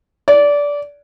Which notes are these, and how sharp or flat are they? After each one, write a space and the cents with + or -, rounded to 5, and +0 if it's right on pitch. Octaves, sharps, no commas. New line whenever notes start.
D5 -20